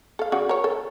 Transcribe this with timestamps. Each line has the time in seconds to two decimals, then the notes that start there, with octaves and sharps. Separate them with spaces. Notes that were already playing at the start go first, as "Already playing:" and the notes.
0.19 A4 F5
0.32 C#3 F#4 D5
0.49 A#4 C#5
0.64 A4